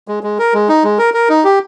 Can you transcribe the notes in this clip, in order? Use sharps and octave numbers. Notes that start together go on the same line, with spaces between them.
G#3
G#3
A#4
G#3
D#4
G#3
A#4
A#4
D#4
G4